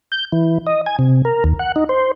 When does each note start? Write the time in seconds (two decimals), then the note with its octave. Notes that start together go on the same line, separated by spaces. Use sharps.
0.12 G6
0.32 E3
0.67 D#5
0.86 G#5
0.99 C3
1.25 A#4
1.44 D#2
1.59 F#5
1.76 D#4
1.89 C5